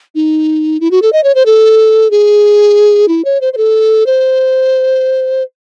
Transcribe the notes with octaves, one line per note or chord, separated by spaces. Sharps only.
D#4
E4
F#4
A4
D#5
C#5
C5
A4
G#4
E4
C#5
C5
C5
A4
C5